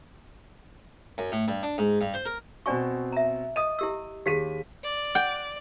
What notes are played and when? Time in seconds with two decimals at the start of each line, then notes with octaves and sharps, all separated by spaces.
1.18 F#2
1.32 A2
1.48 G2
1.63 D4
1.78 G#2
2.01 G2
2.14 C5
2.25 A#4
2.66 B2 C4 F#4 D5 G#5 C#6
3.12 E5 A#5
3.56 D#5 D#6 D#7
3.79 E4 G4 E6
4.26 D#2 G4 G#4 B6 D#7
4.84 D5
5.15 F#5 G5